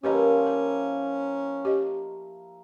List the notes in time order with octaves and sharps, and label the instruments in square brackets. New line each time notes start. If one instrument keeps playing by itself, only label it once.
[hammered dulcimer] F3 A#3 E4 [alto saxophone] C#4 [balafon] G4 B4 D#5
[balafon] A#4
G4 D#5